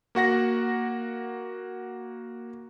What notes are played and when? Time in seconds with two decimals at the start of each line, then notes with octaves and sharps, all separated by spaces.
0.15 A#3 F#4 F#5 A#6